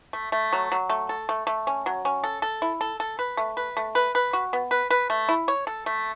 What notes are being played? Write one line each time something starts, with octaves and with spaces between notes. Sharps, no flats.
A3
A3
F#3
F#3
A3
A4
A3
A3
C#4
F#3
C#4
A4
A4
E4
A4
A4
B4
A3
B4
A3
B4
B4
F#4
B3
B4
B4
A3
E4
C#5
A4
A3